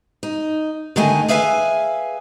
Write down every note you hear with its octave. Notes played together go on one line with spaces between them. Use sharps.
D#4
D3 D#3 A3 D#5 G#5
G#4 B4 E5 F5 G#5